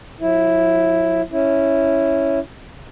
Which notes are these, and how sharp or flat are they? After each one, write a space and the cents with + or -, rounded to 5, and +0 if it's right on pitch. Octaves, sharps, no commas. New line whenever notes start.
F#3 -45 E4 +0
C#4 +0 E4 +0